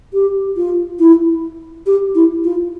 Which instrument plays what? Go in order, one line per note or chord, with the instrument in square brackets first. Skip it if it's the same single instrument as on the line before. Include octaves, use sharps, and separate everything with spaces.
[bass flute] G4
F4
E4
G4
E4
F4